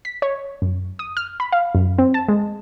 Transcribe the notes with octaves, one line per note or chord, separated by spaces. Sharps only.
B6
C#5
F#2
D#6
F6
B5
F5
F#2
C4
A5
G#3